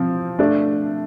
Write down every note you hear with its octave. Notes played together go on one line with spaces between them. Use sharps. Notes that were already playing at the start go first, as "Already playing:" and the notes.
Already playing: F3 C4
A3 D4